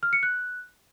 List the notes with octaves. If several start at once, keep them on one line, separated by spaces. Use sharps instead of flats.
F6
C#7
F#6